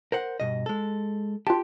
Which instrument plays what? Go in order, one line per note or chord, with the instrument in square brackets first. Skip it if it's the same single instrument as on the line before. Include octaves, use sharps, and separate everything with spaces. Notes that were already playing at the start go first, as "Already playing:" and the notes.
[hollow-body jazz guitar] A#4 C5 F#5
G2 B2 D#5
G#3 A4
[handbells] F4 A5 [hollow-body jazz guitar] G4